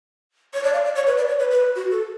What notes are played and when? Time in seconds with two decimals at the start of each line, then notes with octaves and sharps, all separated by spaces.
0.54 C#5
0.63 D5
0.73 F5
0.85 D5
0.95 C#5
1.07 B4
1.17 D5
1.28 C#5
1.39 B4
1.51 B4
1.76 F#4
1.91 A4